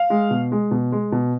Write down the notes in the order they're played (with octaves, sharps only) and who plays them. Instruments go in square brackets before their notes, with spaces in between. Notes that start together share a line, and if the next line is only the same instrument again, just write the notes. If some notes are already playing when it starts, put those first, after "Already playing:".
Already playing: [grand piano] F5
G#3
B2
G#3
B2
G#3
B2